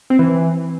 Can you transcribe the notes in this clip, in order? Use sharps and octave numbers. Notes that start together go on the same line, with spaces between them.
C4
E3